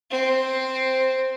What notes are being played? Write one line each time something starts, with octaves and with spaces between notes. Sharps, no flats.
C4